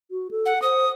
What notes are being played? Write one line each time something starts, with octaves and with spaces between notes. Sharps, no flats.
F#4
A4
F#5
C5 D#6